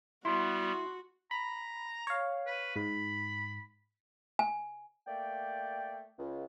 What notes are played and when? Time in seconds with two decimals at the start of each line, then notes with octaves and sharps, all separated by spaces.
0.25 G3 B3 E4 F#4 C6
1.31 A#5 B5
2.07 C#5 F5
2.47 B4
2.76 G#2 B5
4.39 G#5
5.06 A3 A#3 D5 G5
6.17 C#2